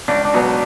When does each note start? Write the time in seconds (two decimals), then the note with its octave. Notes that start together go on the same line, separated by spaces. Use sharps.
0.08 C#2 D4
0.25 D4
0.34 B2 F#3 B3
0.42 D4